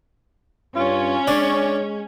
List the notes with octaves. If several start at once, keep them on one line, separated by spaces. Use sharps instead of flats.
G2 C#4 F4
G#3 D4 C#5